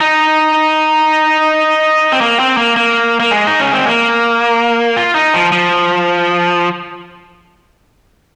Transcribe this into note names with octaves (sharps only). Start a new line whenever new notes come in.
D#4
C4
A#3
C4
A#3
A#3
A#3
G#3
D#4
C#4
C4
A#3
F4
D#4
F3
F3